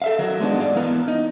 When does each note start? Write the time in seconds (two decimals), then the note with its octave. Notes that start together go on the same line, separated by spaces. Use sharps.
0.02 A4 E5 F5
0.19 D#3 F#3 A#4
0.40 G#3 B3 D4 D#4 F#4
0.59 G#2 D5 F5
0.75 E3 B3 A#4
1.08 D#4